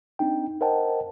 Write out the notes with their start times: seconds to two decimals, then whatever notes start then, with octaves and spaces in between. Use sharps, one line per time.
0.19 C4 D4 D#4 G5
0.61 A#4 C5 D#5 F#5 G5 A5